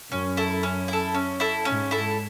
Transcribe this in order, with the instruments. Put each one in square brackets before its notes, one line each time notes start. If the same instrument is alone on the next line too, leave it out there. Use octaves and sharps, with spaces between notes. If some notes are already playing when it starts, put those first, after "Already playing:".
[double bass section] F#2 [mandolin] C#4
[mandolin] E4 A4
C#4
E4 A4
C#4
E4 A4
[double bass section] G#2 [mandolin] C#4
[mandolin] E4 A4